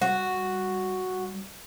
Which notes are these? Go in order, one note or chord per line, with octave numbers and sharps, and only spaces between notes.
G3 F#4